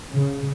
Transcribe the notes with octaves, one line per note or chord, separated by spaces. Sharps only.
C#3